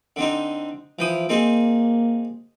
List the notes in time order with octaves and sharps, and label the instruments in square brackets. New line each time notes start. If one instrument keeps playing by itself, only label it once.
[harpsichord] D3 C4 D#4
[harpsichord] E3 G5 D#6 [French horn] F3
[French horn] A#3 [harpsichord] C4 D#4 G#4